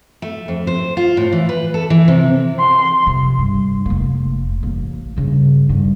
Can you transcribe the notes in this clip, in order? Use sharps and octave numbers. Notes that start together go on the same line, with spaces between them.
A3
F2
C5
F4
A2
E3
B4
A4
E3
C3
C6
F2 C3
G2
F1 A#3
A1 A#3
G2 C#3
G2 D#3